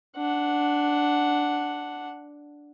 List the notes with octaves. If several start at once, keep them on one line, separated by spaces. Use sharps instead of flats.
D4 F#5